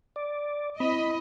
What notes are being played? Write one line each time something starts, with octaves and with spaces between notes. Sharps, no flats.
D5
C4 E4 D#5 B5